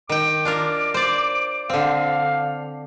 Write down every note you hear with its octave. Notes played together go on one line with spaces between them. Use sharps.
D#3 G5 D6
D4 F4 A#4
C5 D5
D3 C4 F5